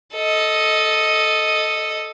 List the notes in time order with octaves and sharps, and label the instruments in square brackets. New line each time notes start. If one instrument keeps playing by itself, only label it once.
[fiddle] A4 D#5